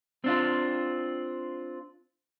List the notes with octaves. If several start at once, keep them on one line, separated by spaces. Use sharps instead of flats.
C4 D4 F4